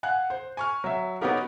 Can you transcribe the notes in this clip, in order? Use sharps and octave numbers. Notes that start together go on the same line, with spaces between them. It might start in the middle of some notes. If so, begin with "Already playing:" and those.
F5 F#5 G#5 F#6
C5
G#5 C#6 F6
F#3 E5
B3 C#4 D#4 F#4 G4 A#4